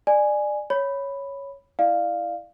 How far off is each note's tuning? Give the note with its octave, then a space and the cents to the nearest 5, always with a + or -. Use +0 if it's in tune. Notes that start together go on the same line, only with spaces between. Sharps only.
D5 +25 G#5 +0
C#5 +0 B5 +0
E4 +0 D5 +25 F5 +0